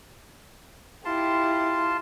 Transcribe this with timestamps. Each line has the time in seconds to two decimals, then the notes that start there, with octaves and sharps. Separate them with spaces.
1.05 E4 F4 G4 A5 C6